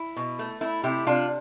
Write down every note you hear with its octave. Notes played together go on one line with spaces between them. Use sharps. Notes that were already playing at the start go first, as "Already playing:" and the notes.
Already playing: E4
B2
A3
A3 E4
C3 E4 G4
C3 D4 F4